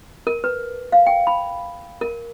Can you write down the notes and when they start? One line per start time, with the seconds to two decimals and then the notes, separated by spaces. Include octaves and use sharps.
0.27 A#4
0.44 B4
0.92 F5
1.07 G5
1.27 B5
2.01 A#4